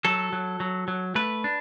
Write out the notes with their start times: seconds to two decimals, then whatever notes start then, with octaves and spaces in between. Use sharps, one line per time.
0.05 F#3 A4
0.33 F#3
0.60 F#3
0.88 F#3
1.15 A3 B4
1.44 D4